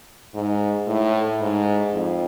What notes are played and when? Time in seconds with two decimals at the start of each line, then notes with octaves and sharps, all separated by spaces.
0.35 G#2
0.87 A2
1.41 G#2
1.93 F2